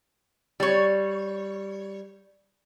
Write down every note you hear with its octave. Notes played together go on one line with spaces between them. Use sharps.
G3 C#5